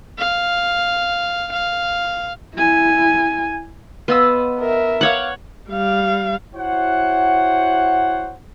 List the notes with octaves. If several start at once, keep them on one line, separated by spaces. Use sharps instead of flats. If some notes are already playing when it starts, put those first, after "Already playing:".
F5
F5
E4 G#5
B3 F4 D#5 E6
A#4 E5
C#5 F5 F#5 D6
G3 F5
E4 F#4 C5 C#5 F#5